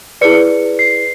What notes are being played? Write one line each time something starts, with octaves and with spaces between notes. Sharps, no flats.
E4 G#4 B4 D5 C#7
C7